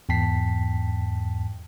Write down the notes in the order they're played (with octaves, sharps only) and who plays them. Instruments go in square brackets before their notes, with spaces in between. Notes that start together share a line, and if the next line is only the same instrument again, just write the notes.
[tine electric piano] E2 G#2 G5 A5 B6 C7